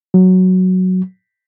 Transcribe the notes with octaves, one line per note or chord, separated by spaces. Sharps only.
F#3